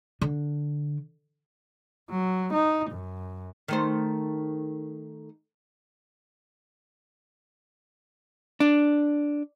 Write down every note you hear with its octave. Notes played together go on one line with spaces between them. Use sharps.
D3
F#3
D#4
F#2
D#3 A3 C5
D4